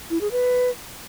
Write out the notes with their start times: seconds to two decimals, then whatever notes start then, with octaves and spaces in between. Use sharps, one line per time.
0.10 E4
0.21 G#4
0.32 B4